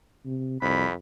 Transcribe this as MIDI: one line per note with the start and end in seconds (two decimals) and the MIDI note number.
0.25 0.59 48
0.62 0.85 36
0.62 0.93 41
0.62 0.91 83